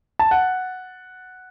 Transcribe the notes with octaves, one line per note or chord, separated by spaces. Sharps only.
A5
F#5